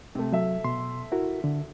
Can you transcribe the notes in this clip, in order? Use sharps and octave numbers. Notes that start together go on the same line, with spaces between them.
C3 A3
F#3 A4 E5
B2 C6
E4 F#4 A#4
D3